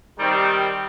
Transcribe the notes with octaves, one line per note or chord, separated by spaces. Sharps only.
D#3 G3 C4